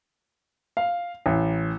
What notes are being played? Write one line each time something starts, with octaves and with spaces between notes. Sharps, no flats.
F5
A1